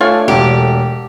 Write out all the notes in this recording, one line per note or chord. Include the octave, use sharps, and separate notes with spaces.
A3 D4 F4 C#5 G#5
E1 G4